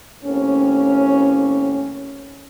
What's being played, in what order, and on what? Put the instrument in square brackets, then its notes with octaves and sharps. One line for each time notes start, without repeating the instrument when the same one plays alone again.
[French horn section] D#2 A2 C4 C#4